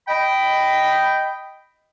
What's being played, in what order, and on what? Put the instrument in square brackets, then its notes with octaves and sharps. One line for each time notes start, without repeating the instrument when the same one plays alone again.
[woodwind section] D#5 G5 B5